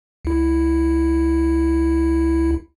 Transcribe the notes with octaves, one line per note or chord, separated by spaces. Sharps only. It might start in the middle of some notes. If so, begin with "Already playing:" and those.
C#2 E4